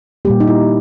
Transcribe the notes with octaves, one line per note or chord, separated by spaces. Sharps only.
A#2 G3 A#3 G4
D#4
E4